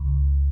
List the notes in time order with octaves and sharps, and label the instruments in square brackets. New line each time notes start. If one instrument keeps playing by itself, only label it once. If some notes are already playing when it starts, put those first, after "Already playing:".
Already playing: [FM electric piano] C#2